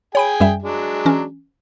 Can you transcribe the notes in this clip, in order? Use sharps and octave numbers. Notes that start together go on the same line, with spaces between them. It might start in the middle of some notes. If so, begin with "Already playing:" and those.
G#4 C#5 G5 G#5 B5 D7
F#2 G3 E5
F#3 G#3 D4
E3 C#4